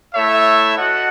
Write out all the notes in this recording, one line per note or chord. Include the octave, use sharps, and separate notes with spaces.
A3 E4 A4 C#5 E5
F#4 A4 D#5 F#5